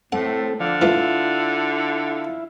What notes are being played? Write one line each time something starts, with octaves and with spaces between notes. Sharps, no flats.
A2 A3 C4 A4 F#5
D3 F3 D5 F5
E3 A3 E4 F4